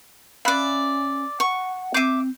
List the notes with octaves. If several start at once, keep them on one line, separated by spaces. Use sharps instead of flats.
C#4 D5 E5 F5 B5 F#6
F#5 C#6
C4 E5 D6 G6 C7 D#7